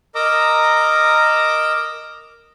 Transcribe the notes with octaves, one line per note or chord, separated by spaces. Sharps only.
A#4 D#5 A#5 D6 E6